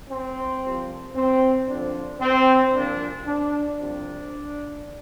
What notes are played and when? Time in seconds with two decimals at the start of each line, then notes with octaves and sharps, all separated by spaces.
0.10 C4
0.63 C2 C3 F3
1.16 C4
1.69 F2 D3 F3 D4
2.20 C4
2.74 C2 A#2 F3 D4
3.27 D4
3.79 C2 C3 F3 D4